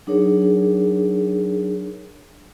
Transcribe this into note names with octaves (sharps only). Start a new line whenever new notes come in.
F#3 D4 D#4 G#4 A#4 C#5